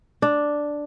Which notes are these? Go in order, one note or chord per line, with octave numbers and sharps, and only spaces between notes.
D4